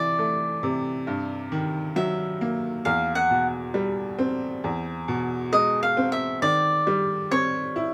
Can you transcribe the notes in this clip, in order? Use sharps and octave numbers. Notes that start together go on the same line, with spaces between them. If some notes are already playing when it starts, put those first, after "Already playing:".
Already playing: C3 E3 D5
A3
C3
G2
D#3
F#3 E5
A#3
E2 F5
F#5
B2
G3
C4
E2
B2
G#3 D#5
F5
C4
E5
D#3 D5
G3
C4 C#5
E4